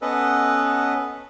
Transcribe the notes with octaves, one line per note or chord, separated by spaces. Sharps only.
B3 C#4 A4 B4 D#5 F#5